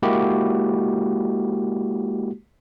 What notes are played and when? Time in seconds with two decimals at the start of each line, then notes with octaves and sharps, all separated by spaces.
0.02 G#3 A#3 E4 F#4 G4